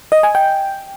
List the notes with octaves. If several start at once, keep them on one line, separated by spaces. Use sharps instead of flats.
D#5
G#5
G5